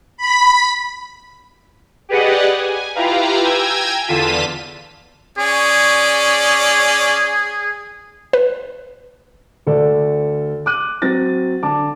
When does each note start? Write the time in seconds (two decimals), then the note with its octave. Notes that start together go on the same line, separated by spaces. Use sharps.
0.17 B5
2.09 G4 G#4 B4 D5 D#5 F#5
2.56 G#5
2.95 E4 F4 G4 B4 F5 A#5
3.43 G5 G#5 A#5 E6 G#6
4.08 E2 D3 F4 A5 B6 D#7
5.38 C#4 G#4 D5 C#6
8.33 B4
9.67 D2 A4 D5
10.66 D6 F#6 D#7
11.02 F#3 C4 A6 A#6
11.63 D3 A5 D6